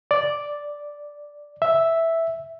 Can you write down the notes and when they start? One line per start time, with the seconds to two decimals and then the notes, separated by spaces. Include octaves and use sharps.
0.11 D5
1.62 E5